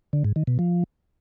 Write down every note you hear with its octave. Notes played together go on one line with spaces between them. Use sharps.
D3
G#2
D#3
B2
F3